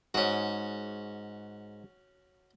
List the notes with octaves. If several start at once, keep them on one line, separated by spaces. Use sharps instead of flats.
G#2 C#4 F#4